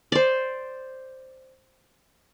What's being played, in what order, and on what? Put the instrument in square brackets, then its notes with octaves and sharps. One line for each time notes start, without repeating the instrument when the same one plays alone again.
[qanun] C5 D5